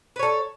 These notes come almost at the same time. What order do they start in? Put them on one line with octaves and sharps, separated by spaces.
B4 C#5 A4